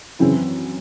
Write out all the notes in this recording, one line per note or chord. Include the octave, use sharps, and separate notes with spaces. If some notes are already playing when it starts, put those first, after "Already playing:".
F#2 C#3 E3 C4 E4